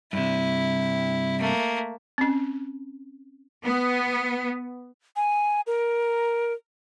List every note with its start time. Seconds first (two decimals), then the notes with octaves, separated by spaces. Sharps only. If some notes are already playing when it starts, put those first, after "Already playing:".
0.13 G2 C3 E4
1.40 A3 A#3
2.18 C4 C#4
3.64 B3
5.16 G#5
5.67 A#4